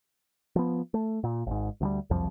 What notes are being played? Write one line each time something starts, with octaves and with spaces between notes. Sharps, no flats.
F3 B3
A3
A#2
G#1 G#2
D2 F3 G3
F#1 C2 F2 F3